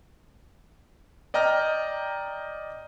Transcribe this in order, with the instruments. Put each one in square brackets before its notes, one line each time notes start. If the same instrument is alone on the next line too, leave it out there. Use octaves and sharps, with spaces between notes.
[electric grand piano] D5 D#5 G5 A#5 F6